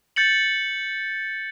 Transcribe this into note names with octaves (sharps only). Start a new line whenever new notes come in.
G6 A6 C#7 F#7